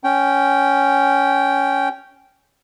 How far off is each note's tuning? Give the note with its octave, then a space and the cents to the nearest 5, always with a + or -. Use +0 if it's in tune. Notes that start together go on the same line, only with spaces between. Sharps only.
C#4 +5 G5 -10